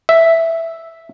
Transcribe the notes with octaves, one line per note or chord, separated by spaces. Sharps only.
E5